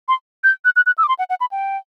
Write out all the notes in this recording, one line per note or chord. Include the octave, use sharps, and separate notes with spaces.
C6
G6
F#6
F#6
F#6
E6
D6
C6
F#5
F#5
B5
G5